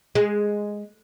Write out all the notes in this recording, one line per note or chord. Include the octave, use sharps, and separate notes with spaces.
G#3